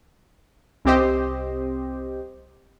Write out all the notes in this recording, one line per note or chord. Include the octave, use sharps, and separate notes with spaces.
C2 C4 G4 C5 D#5